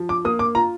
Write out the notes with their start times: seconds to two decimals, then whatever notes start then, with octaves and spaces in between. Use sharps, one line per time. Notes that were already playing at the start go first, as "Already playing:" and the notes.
Already playing: F3
0.09 D6
0.25 A#3 D#6
0.39 D6
0.55 F4 A#5